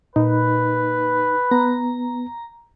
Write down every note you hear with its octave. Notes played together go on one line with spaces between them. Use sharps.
A#2 D#4 B4
B3 A#5